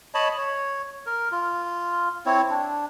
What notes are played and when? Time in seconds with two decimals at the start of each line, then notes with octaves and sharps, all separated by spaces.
0.14 C#5 D#5 A5 B5
0.37 C#5
1.06 A#4
1.32 F4
2.26 C4 E4 C#5
2.50 D4